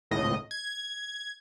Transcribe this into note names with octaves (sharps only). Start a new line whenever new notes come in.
G#1 C#2 A2 D#5
G#6